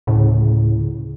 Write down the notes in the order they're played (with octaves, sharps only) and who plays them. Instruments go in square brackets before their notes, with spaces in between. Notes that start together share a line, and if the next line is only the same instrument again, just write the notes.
[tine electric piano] D2 C#3 [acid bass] A2